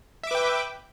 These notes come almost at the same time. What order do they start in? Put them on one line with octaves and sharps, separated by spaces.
E5 D6 B4 G5